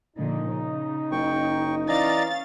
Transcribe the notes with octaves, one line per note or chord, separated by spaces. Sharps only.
A#2 D3 F3 D#4
C#3
F#1 G5 C#6
E3 C#4 D5 D#5 F5 A#5 A6